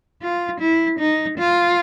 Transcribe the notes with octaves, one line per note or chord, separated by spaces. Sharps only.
F4
E4
D#4
F4